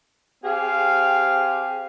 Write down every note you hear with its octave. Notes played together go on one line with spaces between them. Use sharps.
C4 G4 G#4 F5